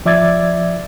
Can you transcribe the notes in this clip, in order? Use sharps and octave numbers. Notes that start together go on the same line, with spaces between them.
F3 D5 E5 D6 G#6 A6